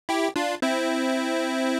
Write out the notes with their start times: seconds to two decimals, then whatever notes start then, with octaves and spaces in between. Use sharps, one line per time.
0.09 E4 G4
0.36 D4 F4
0.62 C4 E4